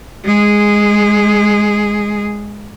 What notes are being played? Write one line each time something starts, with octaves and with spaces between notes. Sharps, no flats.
G#3 G#4